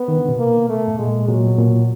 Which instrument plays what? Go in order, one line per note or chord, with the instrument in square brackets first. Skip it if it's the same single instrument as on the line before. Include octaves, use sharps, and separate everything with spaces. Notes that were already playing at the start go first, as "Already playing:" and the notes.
Already playing: [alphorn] B3
[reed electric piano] D#3
D3
B2
[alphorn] A#3
A3
[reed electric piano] A2
[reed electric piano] A#2 [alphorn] G#3
[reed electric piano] A#2 [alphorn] F#3
[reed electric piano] B2
A#2